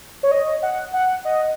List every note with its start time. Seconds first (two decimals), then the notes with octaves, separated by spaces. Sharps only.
0.23 C#5
0.31 D#5
0.63 F#5
0.94 F#5
1.25 D#5